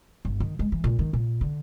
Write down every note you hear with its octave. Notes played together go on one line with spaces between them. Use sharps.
G1
D#3
G#3
E3
A#2
D#3
A#2
D3